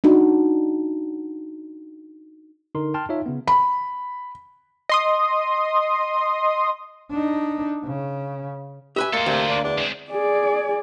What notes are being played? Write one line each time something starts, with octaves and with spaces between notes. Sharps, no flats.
D4 D#4 F#4
D3 D#4 A#4 C6
G5 A5 C6 F6
D#4 F4 C#5 E5
C#3 B3
B5
D#5 C6 D#6
D4 D#4
C#3
G4 B4 E5 G#5
G#3 A#3 A4 C5
D2 C3
D4
E2 D4
G#3 C4
G#4 D5